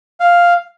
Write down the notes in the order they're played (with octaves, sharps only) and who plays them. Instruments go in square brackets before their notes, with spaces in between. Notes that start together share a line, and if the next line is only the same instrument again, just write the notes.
[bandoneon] F5